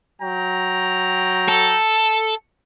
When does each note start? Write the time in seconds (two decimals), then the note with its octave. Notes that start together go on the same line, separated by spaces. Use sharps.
0.21 F#3 G5 A#5
1.49 A4